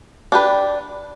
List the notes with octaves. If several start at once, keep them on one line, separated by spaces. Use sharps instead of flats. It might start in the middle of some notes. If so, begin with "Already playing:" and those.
D4 G4 B4